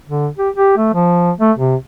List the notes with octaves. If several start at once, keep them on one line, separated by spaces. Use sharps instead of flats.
D3
G4
G4
A3
F3
A3
C3